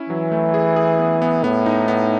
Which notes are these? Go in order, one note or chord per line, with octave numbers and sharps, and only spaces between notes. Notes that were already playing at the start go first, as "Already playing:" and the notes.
Already playing: C#4 E4
E3 F#3
A3
G#4
G#4
B3
B3
A2 B3
D#4
B3